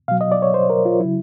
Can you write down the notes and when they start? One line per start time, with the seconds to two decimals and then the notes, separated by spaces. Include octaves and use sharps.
0.08 B2 F#3 F5
0.21 D#5
0.32 D5
0.42 C#5
0.54 C5
0.70 A#4
0.85 F4
1.00 C#3 F#3 E4